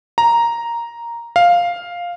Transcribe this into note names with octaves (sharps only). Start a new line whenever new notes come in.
A#5
F5